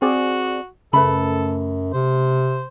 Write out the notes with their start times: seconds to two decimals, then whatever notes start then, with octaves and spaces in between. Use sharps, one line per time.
0.02 C4 F#4 G#4 D5
0.93 F#2 C#3 A3 A4 B4 B5
1.93 C3 C5